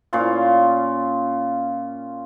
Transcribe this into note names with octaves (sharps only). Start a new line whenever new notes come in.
A#2 C#4 F4 F5